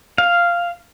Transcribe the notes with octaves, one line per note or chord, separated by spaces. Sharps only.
F5